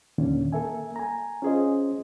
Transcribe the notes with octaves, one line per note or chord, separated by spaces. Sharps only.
D#2 A#2 D3 D#3 C#4
A#3 A4 A#4 E5 G#5
G#5 A#5
C#4 F4 G#4 C5 D#5